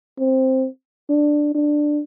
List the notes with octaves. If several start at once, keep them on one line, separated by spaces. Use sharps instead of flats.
C4
D4
D4